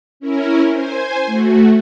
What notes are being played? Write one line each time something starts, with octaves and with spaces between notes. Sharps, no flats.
C#4 E4 A#4
C5 G#5
A3 F#4